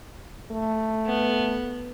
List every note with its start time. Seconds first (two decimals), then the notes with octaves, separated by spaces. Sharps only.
0.52 A3
1.05 B3